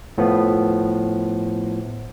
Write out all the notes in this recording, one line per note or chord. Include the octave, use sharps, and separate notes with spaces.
A2 F3 B3